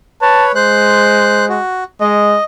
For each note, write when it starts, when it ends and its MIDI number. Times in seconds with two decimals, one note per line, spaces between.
0.22 0.52 71
0.22 0.52 73
0.22 0.47 81
0.55 1.60 56
0.55 1.45 72
0.55 1.45 90
1.49 1.84 66
2.01 2.37 56
2.01 2.44 75